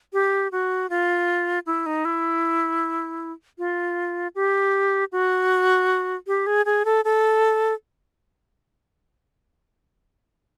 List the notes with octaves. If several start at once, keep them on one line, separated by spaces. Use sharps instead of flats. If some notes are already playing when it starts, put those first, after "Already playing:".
G4
F#4
F4
E4
D#4
E4
F4
G4
F#4
G4
G#4
G#4
A4
A4